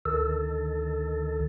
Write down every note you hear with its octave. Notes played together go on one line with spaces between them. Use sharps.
D2 D#3 A4